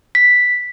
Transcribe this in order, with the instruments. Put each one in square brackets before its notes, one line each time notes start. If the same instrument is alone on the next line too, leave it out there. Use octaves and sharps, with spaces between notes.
[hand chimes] B6